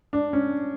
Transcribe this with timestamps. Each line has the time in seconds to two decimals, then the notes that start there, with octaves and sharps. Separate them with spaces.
0.13 D4
0.33 C#4